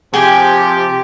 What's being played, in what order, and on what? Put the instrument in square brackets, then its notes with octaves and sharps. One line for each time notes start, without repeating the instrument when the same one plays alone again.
[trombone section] C3 F3 G4 [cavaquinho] G#4 G5 G#5